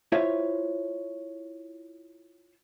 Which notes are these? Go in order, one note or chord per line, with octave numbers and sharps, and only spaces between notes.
E4 F4 C5 C#5 E5 F5